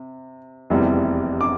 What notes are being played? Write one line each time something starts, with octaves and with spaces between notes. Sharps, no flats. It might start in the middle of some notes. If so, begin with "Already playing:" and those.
Already playing: C3
F1 E2 C3 E3 G3
D6